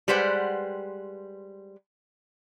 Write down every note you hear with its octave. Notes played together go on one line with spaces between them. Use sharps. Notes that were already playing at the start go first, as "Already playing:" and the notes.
G3 G#3 B4 C5 F#5 G5